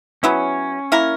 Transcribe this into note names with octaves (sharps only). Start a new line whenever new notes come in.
F#3 B3 C#4 E4
A#3 E4 A#4